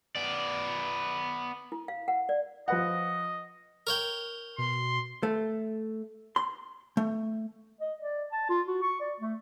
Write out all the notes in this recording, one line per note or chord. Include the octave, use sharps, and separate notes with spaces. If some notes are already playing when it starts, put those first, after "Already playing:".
B3 D5
E4
F5
F#5
D5
F3 B4 D#5 F#5
A#4 C#5 G5
B2 C6
A3
C6
A3
D#5
D5
A5
F4
F#4
C#6
D5
A3